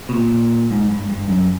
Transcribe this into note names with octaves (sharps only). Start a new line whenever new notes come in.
B2
A#2
G#2
G2
G2
F#2